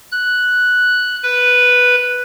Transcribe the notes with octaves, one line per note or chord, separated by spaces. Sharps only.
F#6
B4